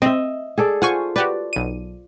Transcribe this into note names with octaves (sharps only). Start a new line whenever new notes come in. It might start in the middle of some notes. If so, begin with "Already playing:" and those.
C4 D#5 E5
G#4 A4 D5
F4 C5 F#5 G#5 C#6
F#4 G4 B4 D5
B1 D#7